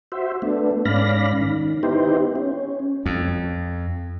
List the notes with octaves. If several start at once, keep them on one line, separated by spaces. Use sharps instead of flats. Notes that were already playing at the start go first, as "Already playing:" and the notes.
F#4 C5 E5
A3 B3 D4
G#2 C#4 D5 F5 B5 A#6
D#3
B3 D#4 E4 G4 C5
C#4
F2